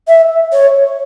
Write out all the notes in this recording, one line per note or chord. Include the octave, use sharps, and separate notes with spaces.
E5
C#5